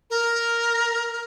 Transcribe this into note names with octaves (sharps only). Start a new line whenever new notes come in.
A#4